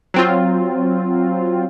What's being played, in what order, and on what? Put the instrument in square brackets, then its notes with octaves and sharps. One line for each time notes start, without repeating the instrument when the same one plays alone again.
[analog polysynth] F#3 C4 F4